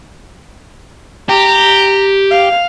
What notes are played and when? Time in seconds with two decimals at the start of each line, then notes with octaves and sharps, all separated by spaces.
1.29 G4 A#5
2.31 F5